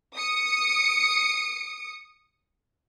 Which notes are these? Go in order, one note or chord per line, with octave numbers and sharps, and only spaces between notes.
D#6 C#7